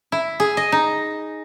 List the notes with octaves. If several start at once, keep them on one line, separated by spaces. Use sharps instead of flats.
E4
G#4
D#5
D#4